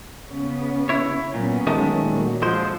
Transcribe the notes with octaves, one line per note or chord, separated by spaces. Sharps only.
C#3 B3 C#4
E4 C#5
A#2 F#3 B3 C#4
D#3 G#3 A3
A#2 F#3
D3 F3 G#3 C5